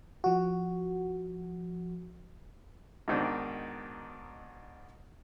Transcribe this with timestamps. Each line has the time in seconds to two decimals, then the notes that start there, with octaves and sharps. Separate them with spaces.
0.24 F3 F#4
3.08 G#2 B2 D#3 C4 D4